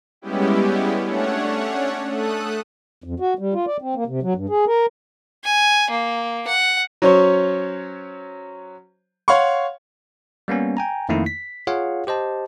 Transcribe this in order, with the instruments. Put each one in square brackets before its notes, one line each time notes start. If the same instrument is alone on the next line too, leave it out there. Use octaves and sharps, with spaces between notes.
[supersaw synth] G3 G#3 B3 C#4 E4 G4
A3 C#4 D4 C#5 F#5
A3 A4 D#6 F#6
[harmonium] F2
F#4
G3
F4
D5
C4
A#3
C3
F#3
G2
G#4
A#4
[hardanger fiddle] G#5
A#3
F#5
[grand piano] F#3 C#4 C5 C#5
C#5 F5 F#5 C6 C#6
[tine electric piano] G3 A#3 B3 C#4
G5 G#5 A#5
F2 D#3 A3 A#3 D#4 E4
B6
F4 G#4 C#5 F5 F#5
G4 C5 D#5 A5